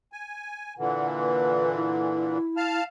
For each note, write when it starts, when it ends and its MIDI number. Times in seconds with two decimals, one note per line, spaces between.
0.12 0.74 80
0.78 2.38 46
0.78 2.38 50
0.78 2.38 52
0.78 1.06 78
1.20 1.74 71
1.75 2.80 64
2.57 2.84 77
2.57 2.84 81
2.57 2.84 89